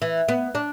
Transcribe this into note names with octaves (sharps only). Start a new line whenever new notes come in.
E3
B3
D4